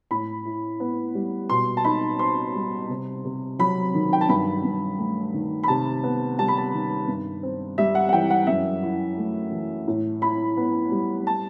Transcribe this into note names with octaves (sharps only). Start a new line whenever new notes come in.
A2 B5
E4
B3
G3
B2 C6
A5
D#4 B5
C4 C6
G3
C3
C3
F#3 B5
D#3
G5
A5
G2 B5
G2
A3
D#3
B5
C3 A5
B3
G3 A5
B5
A5
D#3
G2
C4
G3 E5
F#5
F#5
E3 G5
F#5
F#2 E5
E4
A3
E3
A2
E4 B5
B3
G3
A5